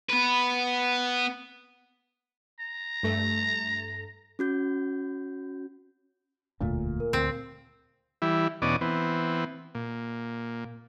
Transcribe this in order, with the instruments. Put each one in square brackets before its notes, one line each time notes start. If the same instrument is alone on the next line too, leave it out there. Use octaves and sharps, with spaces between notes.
[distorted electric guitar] B3 B4
[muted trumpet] A#5
[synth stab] G2 A3
[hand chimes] C#4 F#4 G6
[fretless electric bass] E1 D2 A3 [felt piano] A#2
[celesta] A#4
[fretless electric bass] D2 [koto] C4
[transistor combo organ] E3 G3 E4
E2 B2 C#4 D4 D5 D#5
E3 B3 C4
A#2